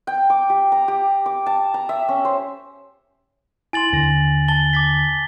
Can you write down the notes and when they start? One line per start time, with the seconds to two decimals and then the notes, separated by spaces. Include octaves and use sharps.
0.07 G5
0.30 D6
0.50 G4
0.72 A#5
0.88 G4
1.26 D6
1.46 A5
1.74 A#5
1.89 E5
2.09 C#4
2.25 C5
3.73 E4 G#5 C6 A6 F#7
3.93 D#2 D3 A#6
4.48 A5 A6 G7
4.73 D6 A6 B6